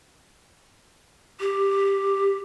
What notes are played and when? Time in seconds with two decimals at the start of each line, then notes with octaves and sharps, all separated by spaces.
1.40 G4